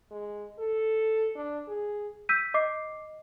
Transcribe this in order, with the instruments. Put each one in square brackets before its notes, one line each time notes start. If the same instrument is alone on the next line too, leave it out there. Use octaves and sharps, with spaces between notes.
[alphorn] G#3
A4
D4
G#4
[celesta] E6 G6 B6 D#7
D#5 D6 C7